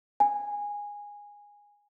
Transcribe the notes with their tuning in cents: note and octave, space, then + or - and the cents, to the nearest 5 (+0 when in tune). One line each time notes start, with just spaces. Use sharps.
G#5 -15